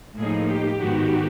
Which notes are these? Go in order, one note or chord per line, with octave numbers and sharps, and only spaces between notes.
A2 F3 A#3 D#4 G#4
G4
G#2 D#3 G#3 B3 F#4